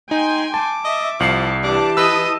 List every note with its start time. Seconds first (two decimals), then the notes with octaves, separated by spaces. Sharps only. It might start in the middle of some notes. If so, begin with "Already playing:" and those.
0.11 D#4 G5 G#5 C6
0.54 A5 D6
0.85 D#5 E5
1.20 C2 F3 A5 C7
1.63 E3 D4 G4 A5 D6
1.97 B4 D#5 D#6 E6